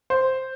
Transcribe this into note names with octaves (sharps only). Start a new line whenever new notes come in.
C5